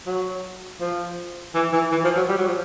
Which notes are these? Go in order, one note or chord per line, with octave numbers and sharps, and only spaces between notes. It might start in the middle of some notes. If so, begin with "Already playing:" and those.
F#3
F3
E3
E3
E3
F3
F#3
G3
F#3
F3